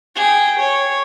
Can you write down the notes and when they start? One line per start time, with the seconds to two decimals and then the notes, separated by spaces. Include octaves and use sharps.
0.16 G#4 G5
0.59 C#5